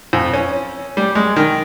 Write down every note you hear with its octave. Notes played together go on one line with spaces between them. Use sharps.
F2
C#4
G3
G#3
D#3